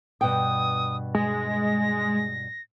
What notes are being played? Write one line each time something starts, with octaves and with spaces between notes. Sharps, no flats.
G2 B2 G5 D#6
G#3 A#6